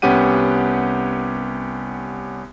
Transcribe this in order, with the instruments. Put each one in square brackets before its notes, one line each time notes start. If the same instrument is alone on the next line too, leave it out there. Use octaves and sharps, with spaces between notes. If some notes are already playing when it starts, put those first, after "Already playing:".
[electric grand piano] C2 B3 C#4 G4 F#5 D#7